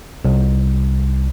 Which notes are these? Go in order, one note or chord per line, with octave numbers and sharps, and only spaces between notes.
C2